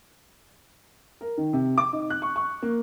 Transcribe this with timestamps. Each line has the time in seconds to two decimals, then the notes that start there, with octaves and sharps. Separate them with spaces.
1.21 A#4
1.37 D#3
1.53 C3
1.78 D6
1.93 D#4
2.10 F#6
2.22 C#6
2.36 C#6
2.62 A#3